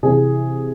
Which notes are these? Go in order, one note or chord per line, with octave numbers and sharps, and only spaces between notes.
C3 E3 G#4